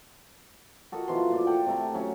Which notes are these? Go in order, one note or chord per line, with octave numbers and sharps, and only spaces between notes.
F#4 A4 A#4 D#5
B2 E3 F3 C6
A#2 D5
A4 F#5 G5
C3 A3 A#5
F#3 C#4